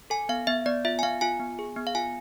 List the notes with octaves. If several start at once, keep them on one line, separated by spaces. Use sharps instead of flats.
A4 G#5
B3 F5
B3 E5
B3 D5
F4 E5
G#5
B3 F5
F4 G#5
B3
G#4
B3
F5
F4 G#5